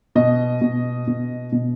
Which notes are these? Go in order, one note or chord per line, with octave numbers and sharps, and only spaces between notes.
B2 D#5
B2
B2
B2